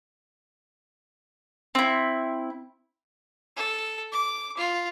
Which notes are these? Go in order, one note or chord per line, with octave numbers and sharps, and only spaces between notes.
C4 E4
A4
D6
F4